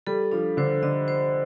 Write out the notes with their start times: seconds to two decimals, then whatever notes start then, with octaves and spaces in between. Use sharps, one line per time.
0.07 G3 A4
0.31 F3 D4
0.57 D3 C5
0.82 D3 D#5
1.08 C5